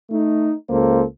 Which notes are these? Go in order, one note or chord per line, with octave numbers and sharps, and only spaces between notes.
A3 D#4
C#2 A#3 A4 C5